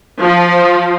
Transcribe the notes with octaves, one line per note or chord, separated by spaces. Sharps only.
F3